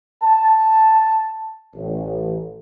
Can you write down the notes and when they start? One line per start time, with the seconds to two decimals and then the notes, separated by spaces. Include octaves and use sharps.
0.23 A5
1.75 A1